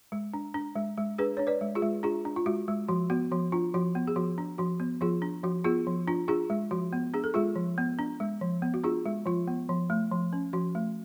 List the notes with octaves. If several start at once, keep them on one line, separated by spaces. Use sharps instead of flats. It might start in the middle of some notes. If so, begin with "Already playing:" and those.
G#3
D4
D4
G#3
G#3
D4 G#4 B4
D4 C#5
B4 D5
G#3
F4 G#4
G#3
D4 F4 G#4
D4
F4
G#3 F#4
G#3
F3 F#4
B3 F#4
F3 F#4
D4 F4
F3 F#4
B3
G#4
F3 F#4
D4
F3 F#4
B3
F3 F4 G#4
D4
F3 F#4
B3 F4 G#4
F3
D4 F4
D4 F4 G#4
G#3
F3 F#4
B3
D4 G#4
A4
G#3 F4 G#4
F3
B3
D4
G#3
F3
B3
F#4
D4 F4 G#4
G#3
F3 F4
B3
F3
A3
F3
C#4
F3 F#4
A3